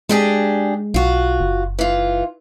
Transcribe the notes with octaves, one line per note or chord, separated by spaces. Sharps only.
G#3 D4 G4 G#4
B1 F4 F#4
F#1
E3 F4